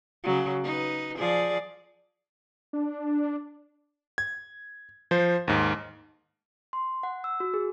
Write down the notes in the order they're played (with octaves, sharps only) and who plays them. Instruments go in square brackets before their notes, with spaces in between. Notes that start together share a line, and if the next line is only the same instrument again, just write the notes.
[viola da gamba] C#3 F#3
D#4 B4
F3 G#4 D5
[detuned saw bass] D4
[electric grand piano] G#6
F3 C5
D#2 G#2
[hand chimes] C6
F#5
E6
F#4
G#4